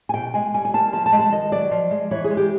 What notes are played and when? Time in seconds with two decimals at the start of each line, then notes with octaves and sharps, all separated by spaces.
0.09 G#5
0.14 B2 G5
0.34 G#3 G#5
0.54 G3 G#5
0.65 G#5
0.74 A#3 A5
0.93 F3 A5
1.06 A5
1.12 G#3
1.19 A5
1.32 D#3 D#5
1.52 F#3 D5
1.71 F3
1.91 G#3
2.11 E3 C#5
2.24 G#4
2.30 G#3
2.37 G4